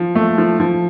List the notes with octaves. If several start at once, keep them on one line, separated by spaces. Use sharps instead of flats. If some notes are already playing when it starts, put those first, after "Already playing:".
Already playing: F3
A3
F3
F3